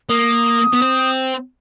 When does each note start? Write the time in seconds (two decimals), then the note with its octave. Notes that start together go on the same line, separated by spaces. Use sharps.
0.09 A#3 D#6
0.73 B3
0.82 C4